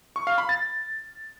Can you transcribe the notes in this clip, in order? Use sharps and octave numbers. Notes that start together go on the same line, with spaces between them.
C#6
F5
B5
A6